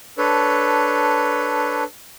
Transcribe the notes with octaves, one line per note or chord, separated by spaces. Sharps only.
D4 A4 B4 C#5